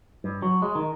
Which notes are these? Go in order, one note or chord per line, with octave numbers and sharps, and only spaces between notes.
G2
F#3
G#3
D#3